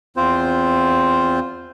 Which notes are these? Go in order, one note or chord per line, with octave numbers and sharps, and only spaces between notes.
E2 C4 F4 C5